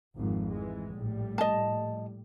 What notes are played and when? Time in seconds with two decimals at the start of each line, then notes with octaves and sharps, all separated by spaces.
0.17 G#1 F2 F3
0.51 E3 G#3
0.94 A#1 A2 G3
1.38 D#5 A5